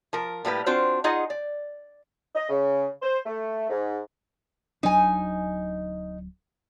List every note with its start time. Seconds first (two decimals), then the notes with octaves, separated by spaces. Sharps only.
0.13 F3 A#4
0.45 A2 G3 A#3 B4
0.66 C4 D4 F4 F#4 C5
1.04 D#4 F4 G#4 D#5 F#5
1.30 D5
2.35 D#5
2.49 C#3
3.02 C5
3.25 A3
3.70 G#2
4.83 D1 F#3 D4 D#4 G#5